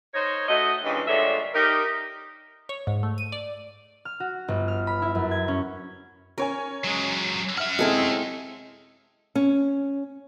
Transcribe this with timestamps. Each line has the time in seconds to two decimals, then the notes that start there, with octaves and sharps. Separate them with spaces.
0.14 D#4 A#4 C5 C#5
0.49 A3 D#4 F#4 D#5
0.84 G2 A#2 E3 G#3 C#4 D#5
1.07 G2 A#2 D3 G#3 C#5 E5
1.54 D#4 G4 A#4
2.69 C#5
2.87 G#2
3.03 A3
3.18 D#7
3.32 D5
4.05 F6
4.20 F#4
4.48 G1
4.68 F6
4.87 B5
5.02 E4
5.15 F#2
5.31 G#6
5.48 C#4
6.38 C#4 A#4 C#5 G#5
6.84 F#3 G#3
7.58 C#4 E5 F#5 F6
7.79 C3 G#3 C4 E4 A4
9.35 C#4